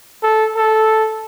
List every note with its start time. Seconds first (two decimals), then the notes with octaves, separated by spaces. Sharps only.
0.23 A4
0.56 A4